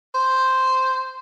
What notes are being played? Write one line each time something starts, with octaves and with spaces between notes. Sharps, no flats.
C5